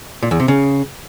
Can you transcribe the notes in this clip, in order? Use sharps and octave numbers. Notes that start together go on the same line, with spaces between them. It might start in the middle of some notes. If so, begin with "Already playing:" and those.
A#2
E2
C3
C#3